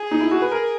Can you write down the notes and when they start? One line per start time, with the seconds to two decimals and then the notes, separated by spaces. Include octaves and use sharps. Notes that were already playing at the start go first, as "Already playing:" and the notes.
Already playing: G#4
0.11 D#4
0.21 E4
0.31 F#4
0.42 B4
0.52 A#4